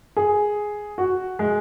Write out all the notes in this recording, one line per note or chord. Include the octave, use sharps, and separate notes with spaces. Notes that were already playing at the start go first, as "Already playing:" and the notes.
G#4
F#4
G#3